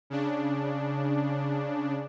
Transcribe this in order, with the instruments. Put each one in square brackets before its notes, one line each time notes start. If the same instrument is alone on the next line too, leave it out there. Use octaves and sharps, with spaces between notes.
[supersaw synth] C#3 D4